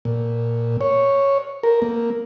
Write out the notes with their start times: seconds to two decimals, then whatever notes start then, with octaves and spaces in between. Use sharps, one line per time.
0.05 A#2
0.81 C#5
1.63 A#4
1.82 A#3